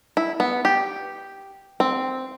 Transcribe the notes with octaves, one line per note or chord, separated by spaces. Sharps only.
E4
B3
G4
C4